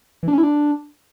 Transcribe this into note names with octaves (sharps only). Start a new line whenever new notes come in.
E3
D4
C#4
E4
D4